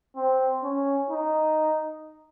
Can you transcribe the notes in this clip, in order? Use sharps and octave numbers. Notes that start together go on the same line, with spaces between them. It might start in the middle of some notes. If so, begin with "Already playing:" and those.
C4
C#4
D#4